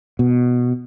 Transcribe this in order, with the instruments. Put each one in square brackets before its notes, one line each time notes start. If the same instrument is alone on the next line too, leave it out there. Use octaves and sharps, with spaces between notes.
[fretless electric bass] B2